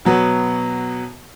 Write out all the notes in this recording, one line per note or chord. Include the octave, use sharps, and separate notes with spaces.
B2 F#3 B3